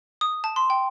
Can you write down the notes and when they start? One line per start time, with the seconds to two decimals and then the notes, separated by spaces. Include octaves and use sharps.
0.21 D#6
0.44 A5
0.56 C6
0.70 G5